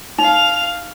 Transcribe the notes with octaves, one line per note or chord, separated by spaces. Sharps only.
D#4 F5 F7